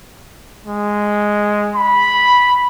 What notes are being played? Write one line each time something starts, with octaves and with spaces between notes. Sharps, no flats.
G#3
B5